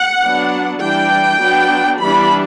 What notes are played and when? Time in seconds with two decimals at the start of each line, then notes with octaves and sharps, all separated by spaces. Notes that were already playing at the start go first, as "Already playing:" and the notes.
Already playing: F#5
0.23 F#3 B3 D4
0.82 E3 G3 D4 G5
1.41 F#3 B3 D4
2.00 E3 G3 B3 D4 B5